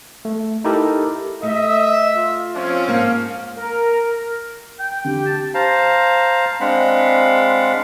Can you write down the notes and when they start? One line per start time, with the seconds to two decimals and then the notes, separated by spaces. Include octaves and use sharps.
0.25 A3
0.64 D#4 E4 G4 A4 A#4
1.43 A3 D#5 E5
2.16 F4
2.55 F3 C4 C#4
2.88 G#2 A#3 F5
3.55 A#4
4.79 G5
5.05 D3 G4
5.26 A5
5.54 C5 F5 A5 A#5
6.60 G#3 C4 D4 F5 F#5 B5